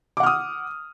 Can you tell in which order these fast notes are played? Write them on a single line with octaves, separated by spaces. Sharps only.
D6 F#5 F6 D#6